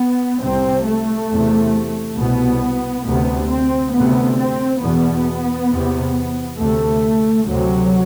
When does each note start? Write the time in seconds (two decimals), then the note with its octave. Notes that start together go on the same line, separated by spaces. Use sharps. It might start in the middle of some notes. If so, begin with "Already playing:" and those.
Already playing: B3
0.41 C2 C3 C4
0.85 A3
1.30 E2 C3
2.17 C2 B2 B3
3.06 D2 C3 B3
3.49 C4
3.93 D2 C3 B3
4.37 C4
4.82 E2 B2 B3
5.70 E2 C3
6.58 D2 C3 A3
7.47 D2 C3 F#3